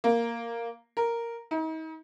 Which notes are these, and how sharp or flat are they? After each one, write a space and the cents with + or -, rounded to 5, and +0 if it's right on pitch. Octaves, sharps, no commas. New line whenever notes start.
A#3 +0
A#4 -5
D#4 +40